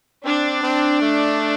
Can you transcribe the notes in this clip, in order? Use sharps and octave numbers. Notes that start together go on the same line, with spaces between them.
C4 D4
C4
A3